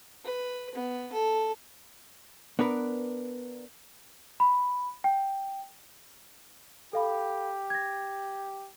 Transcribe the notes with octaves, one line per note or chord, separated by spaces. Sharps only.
B4
B3
A4
B3 D4 A#4 B4
B5
G5
G4 A4 F5 B5
G#6 A#6